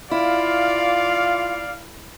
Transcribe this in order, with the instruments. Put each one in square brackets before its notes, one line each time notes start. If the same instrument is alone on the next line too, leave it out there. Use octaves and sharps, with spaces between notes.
[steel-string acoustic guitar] E4 [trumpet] F4 [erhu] D5 [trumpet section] F5